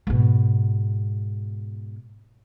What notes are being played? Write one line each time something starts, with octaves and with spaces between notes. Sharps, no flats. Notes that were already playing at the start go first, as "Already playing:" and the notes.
G#2 B2